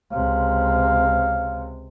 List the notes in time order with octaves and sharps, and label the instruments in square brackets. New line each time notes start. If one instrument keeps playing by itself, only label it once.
[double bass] C#2 C3 [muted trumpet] F5